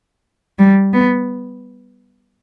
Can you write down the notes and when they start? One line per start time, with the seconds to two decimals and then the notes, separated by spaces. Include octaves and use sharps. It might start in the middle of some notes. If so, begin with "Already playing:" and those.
0.59 G3
0.94 B3